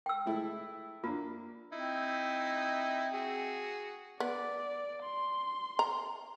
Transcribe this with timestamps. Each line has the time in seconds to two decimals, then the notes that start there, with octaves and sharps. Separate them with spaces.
0.06 G5 E6
0.26 G#3 A3 E4
1.04 A#3 D4 F4
1.73 C4 D#4 E4
3.13 F#4 G#4
4.20 B3 D5
5.03 C6
5.79 A#5